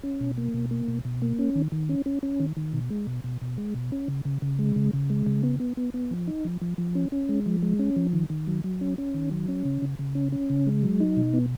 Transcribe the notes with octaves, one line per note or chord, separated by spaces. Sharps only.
C#4
B2
A#3
B2
A#3
B2
B2
A#3
C#4
D#3
D#3
C#4
C#4
C#4
D#3
D#3
B2
G#3
B2
B2
B2
G#3
B2
C#4
C#3
C#3
C#3
G#3
C#3
C#3
G#3
C#3
B3
B3
B3
B3
F3
D#4
F3
F3
F3
C#4
C#4
G#3
F3
G#3
C#4
F3
D#3
D#3
F#3
F#3
C#4
C#4
D#3
F#3
C#4
C#3
C#3
C#3
C#4
C#4
C#3
G#3
F#3
D#4
B2
B3